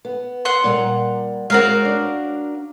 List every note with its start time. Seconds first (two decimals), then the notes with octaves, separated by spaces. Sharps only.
0.05 B3
0.45 F#5 C6
0.64 A#2 G3 A#5
1.50 G#3 C4 F#4 A#4 F5
1.85 D4